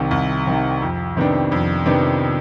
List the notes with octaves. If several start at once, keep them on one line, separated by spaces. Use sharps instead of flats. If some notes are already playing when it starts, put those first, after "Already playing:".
Already playing: C2 C3 D#3
C2
C3 D#3
F2
C3 D#3 B3 D4
F2
C3 D#3 B3 D4